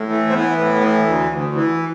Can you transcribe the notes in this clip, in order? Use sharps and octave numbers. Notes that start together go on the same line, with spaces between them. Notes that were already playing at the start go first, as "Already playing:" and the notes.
Already playing: A2
E3 A3
C4
E3 B3
A2 B3
E3
D2
D2
E3